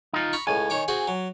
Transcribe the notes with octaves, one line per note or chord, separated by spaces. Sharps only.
D#4 F4
A#5 B5 C#6
C#2 A2 G#5
D#3 C#5 D6
C4 F#4 G#4
F#3